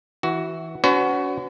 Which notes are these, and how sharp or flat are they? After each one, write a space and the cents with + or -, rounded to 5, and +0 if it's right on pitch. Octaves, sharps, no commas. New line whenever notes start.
E3 -10 F#4 +15
C#4 +45 F#4 +10 B4 +45